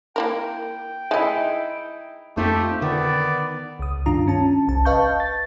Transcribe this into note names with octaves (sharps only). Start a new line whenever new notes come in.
A#3 E4 A#4 G5
G#3 D#4 E4 D#5 E5
F2 A3 C4 D#4 F4 G4
D3 D#3 B3 D5
C#2 D#6
G2 D#3 D4 F4 A#5
C#4 A5
G1 C2 A5
B4 D#5 F5 A5 C#6 G6
A6